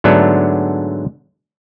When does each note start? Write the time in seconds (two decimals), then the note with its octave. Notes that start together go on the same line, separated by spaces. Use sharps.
0.04 G#2 D3 F#3 A3 B3 D4